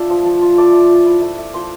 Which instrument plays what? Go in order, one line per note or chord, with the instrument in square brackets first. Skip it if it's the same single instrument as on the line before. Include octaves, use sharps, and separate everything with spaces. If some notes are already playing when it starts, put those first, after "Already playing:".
Already playing: [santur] D4 F4 E5
F3
F3
F4
A3 D5
A3
F4
E4
A3
A3
F3 C5